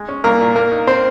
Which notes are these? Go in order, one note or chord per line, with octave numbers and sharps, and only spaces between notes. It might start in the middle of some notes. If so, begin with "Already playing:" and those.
Already playing: G#3
C#4
C2 A#3 A#4
A#2
A#3 A#4
D#4
C4 C5